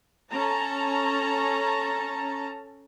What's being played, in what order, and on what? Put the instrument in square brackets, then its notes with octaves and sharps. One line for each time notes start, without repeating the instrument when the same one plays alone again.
[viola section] C#4 A4 A5 A#5